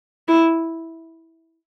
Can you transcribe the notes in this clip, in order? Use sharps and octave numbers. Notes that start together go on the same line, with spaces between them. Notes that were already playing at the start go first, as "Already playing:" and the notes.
E4